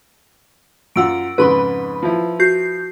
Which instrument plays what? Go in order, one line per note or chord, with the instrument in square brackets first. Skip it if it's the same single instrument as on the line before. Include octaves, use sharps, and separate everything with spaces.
[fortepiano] F#2 F4 [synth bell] F#5 E6 D7
[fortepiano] F2 G#2 C#3 [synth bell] B4 B5 C6
[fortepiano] F3 E4
[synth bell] F#4 G6 C7